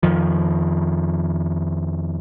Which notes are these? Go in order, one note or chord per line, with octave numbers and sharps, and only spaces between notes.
F2 D#3 F3